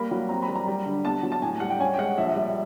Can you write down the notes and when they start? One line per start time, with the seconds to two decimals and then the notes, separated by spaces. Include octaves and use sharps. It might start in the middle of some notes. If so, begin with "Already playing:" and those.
Already playing: G3 A#3 B5
0.11 F#3
0.29 C4 A#5
0.42 B5
0.48 G3
0.55 A#5
0.67 G3
0.85 D3
1.05 B3 A5
1.23 F#3
1.32 A5
1.42 A2 G#5
1.60 G3 F#5
1.70 G5
1.80 C#4 G#5
1.94 G5
1.99 G#3 F#5
2.18 A#1 E5
2.36 G3